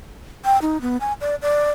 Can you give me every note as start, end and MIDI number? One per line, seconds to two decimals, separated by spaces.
0.45 0.60 79
0.62 0.81 63
0.81 0.97 59
1.01 1.13 80
1.21 1.35 74
1.42 1.71 74